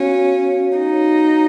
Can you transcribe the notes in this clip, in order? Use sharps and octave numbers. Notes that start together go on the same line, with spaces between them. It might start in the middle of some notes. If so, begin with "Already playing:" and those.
Already playing: B3 C#4 F#4 C#5 F5
D#4